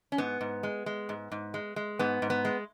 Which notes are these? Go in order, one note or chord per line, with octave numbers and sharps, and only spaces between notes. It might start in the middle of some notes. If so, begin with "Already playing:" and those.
C#4
G#2 B3
G#2
G#3
G#3
G#2
G#2
G#3
G#3
G#2 B3
G#2
B3
G#3